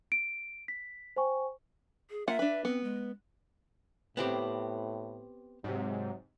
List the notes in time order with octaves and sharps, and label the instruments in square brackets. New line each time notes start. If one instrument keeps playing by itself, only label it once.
[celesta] D7
B6
C5 G5 G#5 C#6
[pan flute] G#4
[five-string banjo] A#3 F4 F#5 [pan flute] E5
[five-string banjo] D4 B4
[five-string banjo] B3 [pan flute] C4
[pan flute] G#3
[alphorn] A2 [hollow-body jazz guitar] B3 C4 G4
[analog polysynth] G#2 C3 [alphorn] F#3